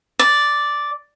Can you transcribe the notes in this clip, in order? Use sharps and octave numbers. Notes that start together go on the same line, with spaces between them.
D5